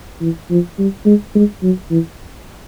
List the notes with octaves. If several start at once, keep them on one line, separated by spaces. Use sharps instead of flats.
E3
F3
G3
G#3
G#3
F#3
E3